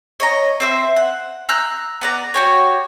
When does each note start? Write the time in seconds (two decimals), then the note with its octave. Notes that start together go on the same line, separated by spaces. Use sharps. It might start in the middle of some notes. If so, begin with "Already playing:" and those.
0.20 C#5 D#5 A#5
0.60 C4 C5 E5
0.96 F#5
1.49 A#5 E6 F#6 G6
2.01 B3 D5 A#5
2.34 F#4 G4 C#5